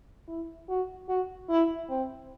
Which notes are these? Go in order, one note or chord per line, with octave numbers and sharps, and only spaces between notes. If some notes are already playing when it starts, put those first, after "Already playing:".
E4
F#4
F#4
E4
C4